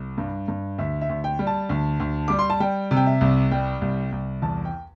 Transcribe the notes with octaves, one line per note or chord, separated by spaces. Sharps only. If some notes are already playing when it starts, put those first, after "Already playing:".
Already playing: C2
G2
G2
D2 E5
E5
D2
G5
G3
A5
D2
D2
G3 D6
C6
A5
G3 G5
C3
G5
E5
C2
G3 G5
C2
C2
E2 A5
G5